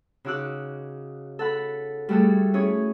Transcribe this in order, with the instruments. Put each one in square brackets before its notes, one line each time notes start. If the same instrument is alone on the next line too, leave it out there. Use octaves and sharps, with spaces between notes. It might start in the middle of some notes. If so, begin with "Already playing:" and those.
[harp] C#3 D#4 F#4 D6 E6 F#6
A4 F#5 B5
G3 A3 F#4 G#4 A4
C#4 E4 G#4 C#5